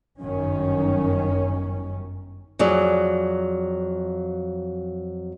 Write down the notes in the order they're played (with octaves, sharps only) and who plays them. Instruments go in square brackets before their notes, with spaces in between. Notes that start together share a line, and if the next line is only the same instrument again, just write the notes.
[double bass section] G1 F#2 D#3 C#4
[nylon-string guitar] F2 F#3 G#4 D5